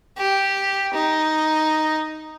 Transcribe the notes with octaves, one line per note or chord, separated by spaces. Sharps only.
G4
D#4